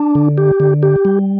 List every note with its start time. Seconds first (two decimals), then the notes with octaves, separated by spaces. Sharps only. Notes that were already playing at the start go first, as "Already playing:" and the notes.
Already playing: D4
0.15 D3
0.38 G4
0.60 D3
0.83 G4
1.05 G3